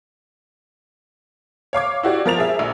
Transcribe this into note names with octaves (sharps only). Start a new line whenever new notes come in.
C#5 F5 D6 G#6
E4 F#4 G4 D5
F3 A#4 A6 F7
G#4 E5
A#1